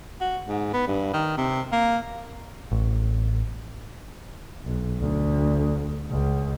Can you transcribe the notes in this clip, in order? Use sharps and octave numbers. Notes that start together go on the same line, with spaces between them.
F#4
G#2
B3
G2
D#3
C3
A#3
A1
B1
D2
C#2